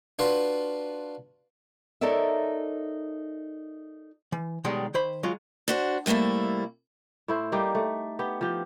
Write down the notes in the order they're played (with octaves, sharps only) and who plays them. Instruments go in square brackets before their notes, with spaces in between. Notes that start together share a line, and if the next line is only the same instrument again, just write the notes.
[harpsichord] D4 F4 F#4 B4 C6
[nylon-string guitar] D#4 A4 A#4 C#5 D5 E5
[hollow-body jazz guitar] E3
B1 D#3 G3 G#3 F#5
D#3 C5 B5
F#3 G#3 F4
[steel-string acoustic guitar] D4 F#4 C5
C3 G3 A3 A#3 E4
[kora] A2 E4 C5
G3 A#3 D#4 G4
A3
B3 G4
F3 G4